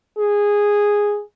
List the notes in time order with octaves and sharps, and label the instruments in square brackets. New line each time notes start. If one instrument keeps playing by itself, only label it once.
[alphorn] G#4